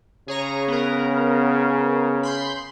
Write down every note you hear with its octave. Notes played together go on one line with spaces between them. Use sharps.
C#3 G#4 C#5 A#5
B3 A#4
B5 C6 G6